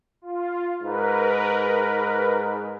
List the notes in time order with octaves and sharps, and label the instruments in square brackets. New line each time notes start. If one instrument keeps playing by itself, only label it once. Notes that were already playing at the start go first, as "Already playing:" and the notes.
[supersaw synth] F4
[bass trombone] G#2 [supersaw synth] A#4 B4